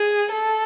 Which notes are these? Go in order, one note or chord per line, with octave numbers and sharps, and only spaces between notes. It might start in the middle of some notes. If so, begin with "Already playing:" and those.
Already playing: G#4
A4